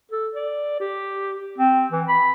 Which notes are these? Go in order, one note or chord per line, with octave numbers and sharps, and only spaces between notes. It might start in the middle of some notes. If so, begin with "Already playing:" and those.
A4
D5
G4
C4
E3
B5